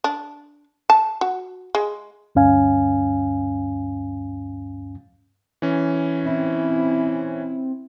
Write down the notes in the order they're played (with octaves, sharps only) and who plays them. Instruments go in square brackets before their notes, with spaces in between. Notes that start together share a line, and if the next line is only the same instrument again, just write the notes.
[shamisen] D4
A5
F#4
G#3
[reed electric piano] D2 G2 C#4 F5 G#5
[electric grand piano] E3 C#4
[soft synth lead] C4 [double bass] E4